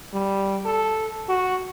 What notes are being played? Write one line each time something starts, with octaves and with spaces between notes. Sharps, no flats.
G3
A4
F#4